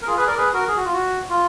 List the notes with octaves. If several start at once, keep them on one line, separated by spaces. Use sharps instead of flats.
A#4
F4 G#4
G#4 B4
A#4 D5
G#4 B4
F#4 A#4
G#4
F#4
F4
F#4
F4